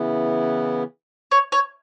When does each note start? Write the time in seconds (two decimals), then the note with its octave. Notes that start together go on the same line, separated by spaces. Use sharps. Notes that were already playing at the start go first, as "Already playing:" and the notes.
Already playing: C#3 E3 B3 E4
1.31 C#5
1.52 C#5